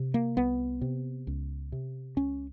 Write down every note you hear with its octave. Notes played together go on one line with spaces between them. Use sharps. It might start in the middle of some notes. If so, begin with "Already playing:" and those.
Already playing: C3
A#3
C2 B3
C3
C#2
C3
C#2 C#4